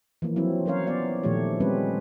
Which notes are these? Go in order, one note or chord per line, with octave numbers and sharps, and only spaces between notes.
E3 F3 A#3
F3 F#3 C4 E4
F#3 C#4 A#4 C5 C#5 F5
B3 D5 F5
A#2 D#3 F3 A3 G4 C#5
G3 G#3 C4 C#4 B4